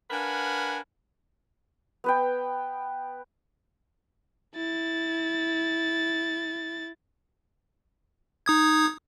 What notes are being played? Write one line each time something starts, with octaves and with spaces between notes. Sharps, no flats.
D4 A#4 B4 F5 F#5 G#5
B3 B4 G5
E4 A6
D#4 D#6 G#6